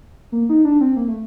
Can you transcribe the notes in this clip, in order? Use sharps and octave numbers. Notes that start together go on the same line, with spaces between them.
A#3
D#4
D4
C4
A#3
A3